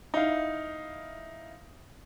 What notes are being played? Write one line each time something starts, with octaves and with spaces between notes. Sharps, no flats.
D#4 E4 F5